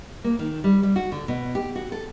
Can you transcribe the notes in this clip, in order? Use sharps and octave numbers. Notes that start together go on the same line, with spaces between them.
A#3
D#3
G3
G3
F#4
D3
B2
G4
F#4
A4